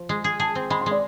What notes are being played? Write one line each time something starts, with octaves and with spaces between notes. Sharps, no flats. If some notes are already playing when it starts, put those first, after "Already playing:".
Already playing: F3
G#3
G#4
G#4 A5
C4
G#3 B5
C6
G#3
D5